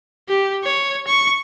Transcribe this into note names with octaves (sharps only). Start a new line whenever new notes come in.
G4
C#5
C#6